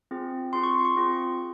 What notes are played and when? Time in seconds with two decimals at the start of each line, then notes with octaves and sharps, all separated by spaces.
0.11 C4 F4 G#4
0.53 C4 F4 G#4 C6
0.63 C#6
0.75 C6
0.85 C#6
0.96 C4 F4 G#4